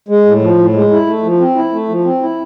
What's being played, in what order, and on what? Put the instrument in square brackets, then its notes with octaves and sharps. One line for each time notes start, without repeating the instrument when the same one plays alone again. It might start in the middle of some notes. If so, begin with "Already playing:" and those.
[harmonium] G#3
A2
F3
A2
G#3
E4
A3
F3
C4
E4
A3
F3
C4
E4